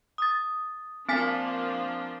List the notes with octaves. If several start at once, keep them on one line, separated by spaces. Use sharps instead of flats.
D#6 A6
F3 A#3 C4 D4 G#5 B6